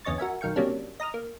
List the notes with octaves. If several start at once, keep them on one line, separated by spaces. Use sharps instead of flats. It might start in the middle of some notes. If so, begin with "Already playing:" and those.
G1 E2 C#4 D#5 C#6 A6
F#4 A#4 E5 G#5
B1 D#3 F5 G5 C#6
C3 F#3 G3 A#3 C#4 D4
D#5 A#5 D#6 F6
A#3